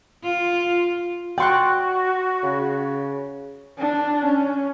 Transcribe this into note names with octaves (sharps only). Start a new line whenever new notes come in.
F4
F#4 D5 G5 C6 C#6 F#6
C#3
D4
C#4